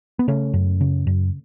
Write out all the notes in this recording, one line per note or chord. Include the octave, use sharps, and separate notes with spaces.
B3
C#3 A3 C#4
F#2
C#3
F#2